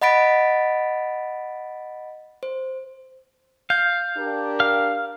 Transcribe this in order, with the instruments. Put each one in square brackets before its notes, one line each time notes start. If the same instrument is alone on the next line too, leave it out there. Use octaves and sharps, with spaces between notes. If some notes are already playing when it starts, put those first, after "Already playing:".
[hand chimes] D#5 F#5 B5 A6 B6 D7
C5
[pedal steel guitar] F5 [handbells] G6
[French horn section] D4 G4 A#4
[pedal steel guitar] F5 F6